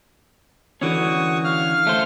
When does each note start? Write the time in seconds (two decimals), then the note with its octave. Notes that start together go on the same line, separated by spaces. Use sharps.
0.81 D3 E3 C#4 F#4 C#6 D#6
1.44 F5 F6
1.87 A3 C5